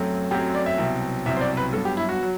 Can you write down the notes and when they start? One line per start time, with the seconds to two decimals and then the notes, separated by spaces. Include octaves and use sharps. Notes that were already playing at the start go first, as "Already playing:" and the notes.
Already playing: F#2 F#3 A3 C4
0.31 F#2 F#3 A3 C4 G4
0.55 D5
0.66 E5
0.78 C2 B2 F#3 C4
1.26 C2 B2 F#3 C4 E5
1.37 C5
1.41 D5
1.57 B4
1.73 G2 F#3 B3 A4
1.85 G4
1.97 E4
2.09 F#4
2.23 F#3